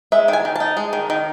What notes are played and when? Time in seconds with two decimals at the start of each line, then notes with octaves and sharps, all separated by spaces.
0.12 G#3 E5
0.28 D#3
0.33 G#5
0.45 D#3
0.56 D#4 A5
0.77 G#3
0.93 D#3
1.10 D#3